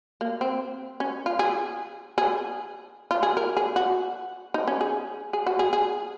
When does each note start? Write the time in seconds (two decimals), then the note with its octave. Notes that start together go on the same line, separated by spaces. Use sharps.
0.21 A#3
0.41 C4
1.00 C#4
1.26 F4
1.39 G#4
2.18 G#4
3.11 F4
3.23 G#4
3.37 A#4
3.57 G#4
3.76 F#4
4.54 D#4
4.68 C#4
4.81 G#4
5.33 G#4
5.47 F#4
5.59 G#4
5.73 G#4